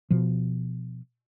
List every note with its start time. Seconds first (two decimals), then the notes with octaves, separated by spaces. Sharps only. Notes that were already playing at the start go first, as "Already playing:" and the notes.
0.10 B2 F3